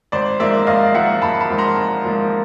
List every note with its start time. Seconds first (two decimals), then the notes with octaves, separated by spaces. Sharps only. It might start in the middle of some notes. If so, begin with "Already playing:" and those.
0.12 G#1 C5 D5
0.40 G#2 F3 A#3 D5 E5
0.67 G#1 D#5 F5
0.94 G#2 F3 A#3 E5 F#5
1.22 G#1 A5 B5
1.40 A5 B5
1.49 G#2 F3 A#3
1.58 A#5 C6
1.76 G#1
2.04 G#2 F3 A#3